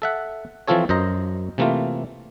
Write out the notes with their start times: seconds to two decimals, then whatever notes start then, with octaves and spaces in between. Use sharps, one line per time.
0.02 A4 E5 F#5
0.68 E3 F3 C4 F4 A4 C#5
0.89 F#2 C5 D#5 A#5
1.58 C3 E3 A3 A#3 F4